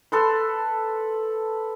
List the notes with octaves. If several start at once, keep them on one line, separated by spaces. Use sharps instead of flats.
A4 B4 C6